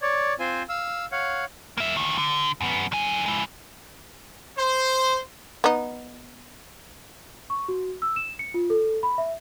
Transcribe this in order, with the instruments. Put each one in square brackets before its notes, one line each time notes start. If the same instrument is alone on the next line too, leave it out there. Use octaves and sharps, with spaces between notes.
[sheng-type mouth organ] C#5 D5
C4 F4 C5 G#5
F5 E6
C#5 F5 F#5
[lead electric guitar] A#3 E5
D2 D#3
D3
F#2 B3
D3 G#5
G#3 E4
[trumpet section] C5
[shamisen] B3 D#4
[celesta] C#6
F#4
E6
E7
C#7
F4
A4
B5
E5